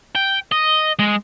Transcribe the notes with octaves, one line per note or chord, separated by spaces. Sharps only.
G5
D#5
G#3